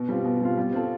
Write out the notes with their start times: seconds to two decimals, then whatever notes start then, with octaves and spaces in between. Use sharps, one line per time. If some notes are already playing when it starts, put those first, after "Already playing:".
Already playing: B2
0.09 G3 C4 F4
0.25 B2
0.41 G3 C4 F4
0.57 G3
0.73 C4 F4 A4